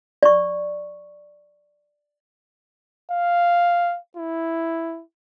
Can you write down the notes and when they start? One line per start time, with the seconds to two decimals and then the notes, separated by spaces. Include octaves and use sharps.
0.23 D5 C#6
3.11 F5
4.17 E4